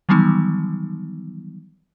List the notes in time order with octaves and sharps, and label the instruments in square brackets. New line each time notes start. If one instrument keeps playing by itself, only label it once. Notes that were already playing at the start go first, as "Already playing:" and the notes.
[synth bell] D#3 E3 F#3 G3 B3 D#4